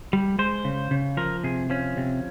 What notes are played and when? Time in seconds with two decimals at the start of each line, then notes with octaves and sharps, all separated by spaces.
0.13 G3
0.39 G#3 C5
0.64 C#3
0.91 C#3
1.17 F3 A#4
1.43 C3 G#4
1.70 F3 C#4
1.97 C3